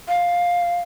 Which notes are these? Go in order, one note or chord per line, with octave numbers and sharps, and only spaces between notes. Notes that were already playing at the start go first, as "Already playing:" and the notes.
F5